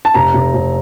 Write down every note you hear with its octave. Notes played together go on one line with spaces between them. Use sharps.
A5
F1 A#5
F1
F1